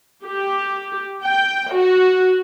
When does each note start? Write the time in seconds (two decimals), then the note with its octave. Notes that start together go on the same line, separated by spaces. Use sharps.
0.24 G4
1.24 G5
1.73 F#4